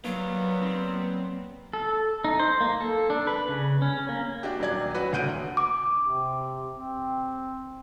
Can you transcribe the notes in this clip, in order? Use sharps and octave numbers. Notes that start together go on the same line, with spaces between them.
F#3 G3 A#3 B3 D#4 F5
C4
A4
D#4
C5
A#3
A4
D4
B4
C#3
C#4
A#3
D4 F#4 G4
D#1 F#3 D5 G#6
C#4 F#4 B4
D#1 D2 F#5 G6 D7 D#7
D6
C3
C4